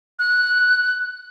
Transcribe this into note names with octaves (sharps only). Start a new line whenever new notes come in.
F#6